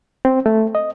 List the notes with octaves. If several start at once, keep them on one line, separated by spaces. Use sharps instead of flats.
C4
A3
D#5